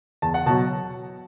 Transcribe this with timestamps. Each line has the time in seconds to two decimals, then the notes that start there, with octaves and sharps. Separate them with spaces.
0.22 E2 A5
0.34 F#5
0.46 B2 F#3 A5